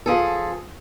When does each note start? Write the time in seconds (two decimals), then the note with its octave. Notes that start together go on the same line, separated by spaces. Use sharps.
0.06 F3 G#4 A4